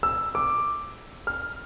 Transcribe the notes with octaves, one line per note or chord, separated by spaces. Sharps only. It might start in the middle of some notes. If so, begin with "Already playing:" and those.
E6
D6
F6